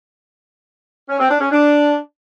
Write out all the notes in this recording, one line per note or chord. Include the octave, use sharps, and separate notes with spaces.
C#4
C4
D4
C#4
D4